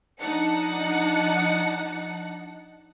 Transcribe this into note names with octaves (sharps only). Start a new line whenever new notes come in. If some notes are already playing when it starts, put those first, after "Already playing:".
F3 D4 D#4 F#5 A5 C#7